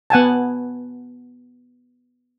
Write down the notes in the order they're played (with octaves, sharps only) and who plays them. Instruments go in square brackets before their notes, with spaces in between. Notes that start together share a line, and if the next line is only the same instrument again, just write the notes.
[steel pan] B3 F#5 G#5 A5